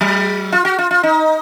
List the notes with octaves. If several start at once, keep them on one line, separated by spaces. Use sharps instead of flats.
F#3
F4
F#4
F4
F4
D#4